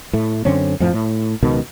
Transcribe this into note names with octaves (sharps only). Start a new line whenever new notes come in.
A2 A3
F#2 D3 C4 C#4
F2 A2 F3
A2
C#2 B2 D#3